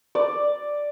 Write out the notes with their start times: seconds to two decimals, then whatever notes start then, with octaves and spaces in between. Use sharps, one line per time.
0.15 D5